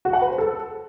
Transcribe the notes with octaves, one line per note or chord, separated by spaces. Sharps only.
F#4
F#5
B4
C5
A4